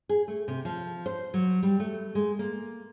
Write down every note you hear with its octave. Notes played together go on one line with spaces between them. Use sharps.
G#4
A3
C3
F3
C5
F#3
G3
A3
G#3
A#3